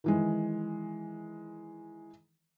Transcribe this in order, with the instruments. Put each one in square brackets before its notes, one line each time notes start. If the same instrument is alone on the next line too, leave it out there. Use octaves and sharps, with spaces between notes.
[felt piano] D#3 E3 G#3